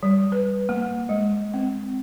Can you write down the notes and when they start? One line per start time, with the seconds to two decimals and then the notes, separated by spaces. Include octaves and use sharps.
0.03 G3
0.32 B4
0.69 A#3
1.09 G#3
1.54 C4